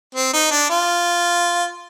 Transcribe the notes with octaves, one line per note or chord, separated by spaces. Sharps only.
C4
D#4
D4
F4